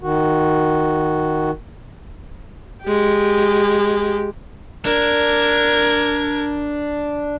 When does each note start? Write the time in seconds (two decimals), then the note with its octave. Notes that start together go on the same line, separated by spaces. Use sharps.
0.02 D#3 F#4
2.84 G#3 G4
4.85 D4 A#4 G#6